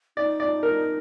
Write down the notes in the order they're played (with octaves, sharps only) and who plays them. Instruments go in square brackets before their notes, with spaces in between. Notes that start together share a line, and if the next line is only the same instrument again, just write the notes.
[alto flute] D#4 [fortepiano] D5
[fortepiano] D5
A#4